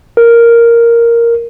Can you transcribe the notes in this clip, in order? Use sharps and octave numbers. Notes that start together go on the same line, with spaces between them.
A#4